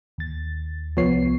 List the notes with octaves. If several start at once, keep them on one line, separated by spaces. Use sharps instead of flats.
D#2 A6
C2 F3 B3 C#5 C7